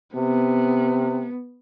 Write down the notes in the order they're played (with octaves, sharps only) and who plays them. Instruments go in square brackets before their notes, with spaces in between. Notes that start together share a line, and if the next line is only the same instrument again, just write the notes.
[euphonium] C3 [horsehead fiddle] B3